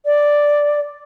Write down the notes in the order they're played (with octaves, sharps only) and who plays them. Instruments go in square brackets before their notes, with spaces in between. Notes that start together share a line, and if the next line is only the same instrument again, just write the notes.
[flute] D5